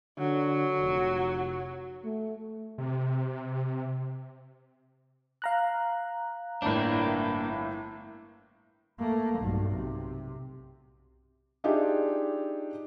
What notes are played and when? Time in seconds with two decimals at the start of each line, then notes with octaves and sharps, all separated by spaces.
0.18 D3 F#3
0.79 F1
2.04 A3
2.78 C3
5.42 F5 A#5 F#6
6.62 G1 A2 A#3 D4
9.00 A3 A#3
9.40 B1 G2
9.76 C3
11.64 D4 D#4 F4 G4 G#4 E5